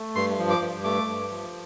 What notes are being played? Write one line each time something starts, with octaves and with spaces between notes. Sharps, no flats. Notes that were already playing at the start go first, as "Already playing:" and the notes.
Already playing: A3
G2 C6
F3
D6
G2
A3 D6
G2
F3